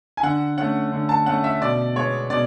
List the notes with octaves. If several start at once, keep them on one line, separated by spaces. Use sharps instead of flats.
G#5
D3 F#5
A3 C#4 F#5
D3
A5
A3 C#4 F#5
E5
B2 D5
G#3 B3 C#5
B2 D5